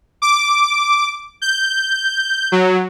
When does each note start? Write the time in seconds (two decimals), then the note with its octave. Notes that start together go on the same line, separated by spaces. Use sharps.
0.22 D6
1.42 G6
2.52 F#3